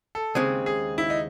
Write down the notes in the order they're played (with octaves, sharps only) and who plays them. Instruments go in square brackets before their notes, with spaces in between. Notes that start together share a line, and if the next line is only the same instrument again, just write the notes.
[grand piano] A4
[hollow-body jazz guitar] D#2 C#3 G#3 C4 [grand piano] G#4
[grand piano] G#4
E4
D#4